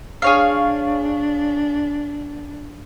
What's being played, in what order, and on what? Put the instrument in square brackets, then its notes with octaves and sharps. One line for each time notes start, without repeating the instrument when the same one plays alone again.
[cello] D4 [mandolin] G#4 C#5 F5